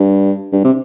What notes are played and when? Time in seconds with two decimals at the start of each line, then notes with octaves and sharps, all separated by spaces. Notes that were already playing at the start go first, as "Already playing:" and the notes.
Already playing: G2
0.52 G2
0.64 C3